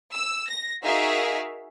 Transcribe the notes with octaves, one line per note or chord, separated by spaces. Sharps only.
E6
A#6
D#4 F#4 G#4 A#4 E5 F5